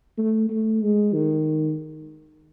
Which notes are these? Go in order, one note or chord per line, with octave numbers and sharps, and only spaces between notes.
A3
A3
G#3
D#3